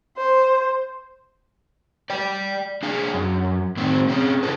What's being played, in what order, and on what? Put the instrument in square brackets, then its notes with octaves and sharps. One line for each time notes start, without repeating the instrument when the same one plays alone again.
[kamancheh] C5
[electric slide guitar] D5 G5
D4 G#4 F5
F#2
A2 D#3 A3 C4
C4 C#4 G#4
D3 E4 F#4 G#4 A4 B4